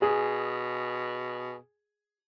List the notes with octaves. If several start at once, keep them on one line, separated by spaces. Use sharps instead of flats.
B2 G#4